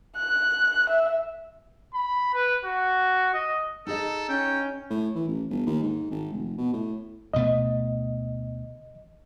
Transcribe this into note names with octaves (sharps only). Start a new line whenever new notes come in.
F#6
E5
B5
B4
F#4
D#5
D#4 G#4 A4 D#5
C#4 G5
A2
E3
A1
G1
D#2
G#2
G#1
F1
B2
A2
D2 B2 A3 D#5